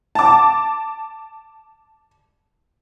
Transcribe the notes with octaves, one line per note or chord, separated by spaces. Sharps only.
A5 D6